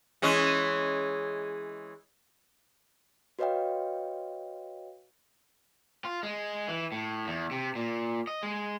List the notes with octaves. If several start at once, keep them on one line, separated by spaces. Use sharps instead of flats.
E3 G#3 C#4
F#4 B4 C#5 D#5 F5 G5
F4
G#3
E3
A2
E2
C3
A#2
D#5
G#3